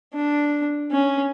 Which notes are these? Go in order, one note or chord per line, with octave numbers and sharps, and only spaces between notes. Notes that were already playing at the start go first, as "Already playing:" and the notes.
D4
C#4